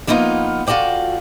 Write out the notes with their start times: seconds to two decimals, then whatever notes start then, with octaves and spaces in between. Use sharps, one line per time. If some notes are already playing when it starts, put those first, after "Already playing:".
0.07 F3 G3 A#3 B3 D#4 F4
0.67 F4 F#4 A4 D5 G5